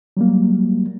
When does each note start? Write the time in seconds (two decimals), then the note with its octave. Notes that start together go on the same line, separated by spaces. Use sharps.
0.17 F#3 G3 A#3